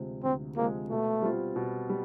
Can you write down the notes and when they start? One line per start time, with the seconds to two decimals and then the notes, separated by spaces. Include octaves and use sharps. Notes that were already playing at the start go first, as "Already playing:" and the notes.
Already playing: D2 C3 F3 G#3
0.23 D2 C4
0.56 C3 F3 G#3 A#3
0.90 B2 A3
1.22 G3 C4 F4
1.56 B2
1.89 G3